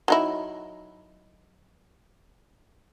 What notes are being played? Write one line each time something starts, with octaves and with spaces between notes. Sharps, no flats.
F#3 D#4 E4